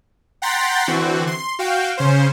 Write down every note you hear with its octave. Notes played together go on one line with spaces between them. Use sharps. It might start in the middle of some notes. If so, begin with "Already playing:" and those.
F#5 G5 A#5 C6 A6 B6
D3 E3 C4 F#4
C6
F#4 F5 G5
C#3 C#4 C5